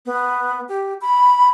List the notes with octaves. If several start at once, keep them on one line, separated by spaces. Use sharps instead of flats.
B3
G4
B5